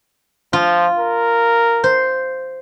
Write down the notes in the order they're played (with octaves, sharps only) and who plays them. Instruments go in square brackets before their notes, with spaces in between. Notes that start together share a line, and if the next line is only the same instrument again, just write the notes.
[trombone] F3 [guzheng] F4
[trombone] A#4
[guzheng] C5